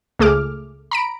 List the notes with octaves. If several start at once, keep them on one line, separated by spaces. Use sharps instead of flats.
C#2 A3 G#4 D6 F6
A#5 B5 D7